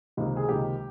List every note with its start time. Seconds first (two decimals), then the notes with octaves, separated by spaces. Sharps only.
0.17 C#2 C3 D#3 A#3
0.37 G#4
0.48 C#2 C3 D#3 A#3 G4